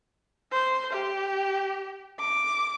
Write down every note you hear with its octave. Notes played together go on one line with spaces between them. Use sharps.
C5
G4
D6